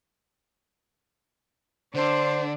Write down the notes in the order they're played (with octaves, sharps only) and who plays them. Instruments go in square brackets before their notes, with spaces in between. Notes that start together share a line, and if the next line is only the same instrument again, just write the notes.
[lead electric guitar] D3 [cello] D4 [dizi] C5